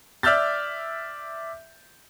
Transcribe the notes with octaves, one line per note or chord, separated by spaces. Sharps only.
D5 E5 E6 F6 G6 A6